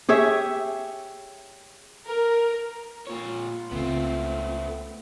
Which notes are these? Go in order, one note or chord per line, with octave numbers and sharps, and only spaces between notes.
G4 G#4 C#5 E5
A#4
A#2 F4 C#5
C#2 C#3 A3 B3 C4